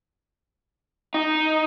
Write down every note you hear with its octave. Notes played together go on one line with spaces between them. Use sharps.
D#4